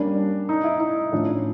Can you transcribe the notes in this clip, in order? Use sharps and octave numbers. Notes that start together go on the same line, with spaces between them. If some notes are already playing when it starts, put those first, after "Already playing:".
Already playing: G3 A#3 C#4 D4
D#4
E4
D#4
A2 F3 A3 C#4 D4